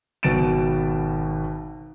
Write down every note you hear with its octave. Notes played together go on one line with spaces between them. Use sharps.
G#1 B2 A6 D7 E7